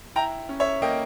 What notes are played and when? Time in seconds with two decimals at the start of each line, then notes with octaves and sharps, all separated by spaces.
0.16 E4 G5 A#5
0.49 C#4
0.60 C#5 E5
0.82 A#3 D#5 G5